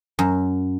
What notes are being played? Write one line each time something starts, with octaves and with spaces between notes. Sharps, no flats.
F#2